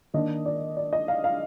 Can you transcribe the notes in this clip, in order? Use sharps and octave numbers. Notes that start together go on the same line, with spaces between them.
D#3 A#3 D4 D#5
D5
D5
D#5
F5
F5